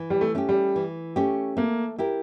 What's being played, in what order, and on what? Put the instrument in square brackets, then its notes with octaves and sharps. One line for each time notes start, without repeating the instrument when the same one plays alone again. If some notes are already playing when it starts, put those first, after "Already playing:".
Already playing: [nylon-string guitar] E3
[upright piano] G3
A3
[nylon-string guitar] A3 C#4 G4
[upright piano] G3
[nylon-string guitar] E3
A3 C#4 G4
[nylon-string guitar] A3 [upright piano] A#3
[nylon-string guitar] E4 G4 A#4